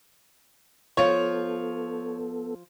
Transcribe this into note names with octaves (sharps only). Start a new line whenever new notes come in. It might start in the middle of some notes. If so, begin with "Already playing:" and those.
F3 B3 F4 A4 C#5